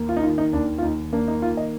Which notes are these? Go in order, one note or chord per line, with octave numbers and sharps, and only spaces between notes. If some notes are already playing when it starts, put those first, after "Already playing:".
Already playing: D#2 A#3
F4
D#4
D#3 F4
D#4
D#2 D4
F4
D#2 D#4
A#3 D4
D#4
D#3 F4
D#5